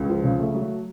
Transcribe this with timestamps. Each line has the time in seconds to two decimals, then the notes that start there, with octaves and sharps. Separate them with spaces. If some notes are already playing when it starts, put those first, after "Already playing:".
Already playing: C#2
0.09 F3
0.24 C#3
0.39 A3
0.54 F#3